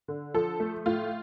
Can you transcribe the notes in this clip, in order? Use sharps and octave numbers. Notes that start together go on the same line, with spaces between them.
D3
F3 A4
A3
A2 F4